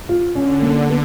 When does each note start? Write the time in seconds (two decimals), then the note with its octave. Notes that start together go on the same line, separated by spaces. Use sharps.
0.09 F4
0.35 D3 C#4
0.62 A#3
0.89 B3